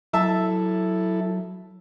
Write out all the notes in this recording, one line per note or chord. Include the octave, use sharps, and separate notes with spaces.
F#3 E4 A4 E5 A5